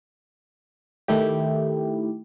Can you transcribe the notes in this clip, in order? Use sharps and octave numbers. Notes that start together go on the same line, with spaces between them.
D#3 A3 E4 G4